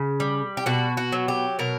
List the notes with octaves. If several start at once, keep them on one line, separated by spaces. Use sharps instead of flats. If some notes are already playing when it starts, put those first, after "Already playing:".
Already playing: C#3
G3
G4
B2 F#4
F#4
F#3
G4
B2 A#4